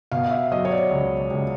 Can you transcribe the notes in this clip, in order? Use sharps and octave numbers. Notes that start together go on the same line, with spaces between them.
B2 F5
E5
F#3 D#5
C#5
D5
C#2
C#2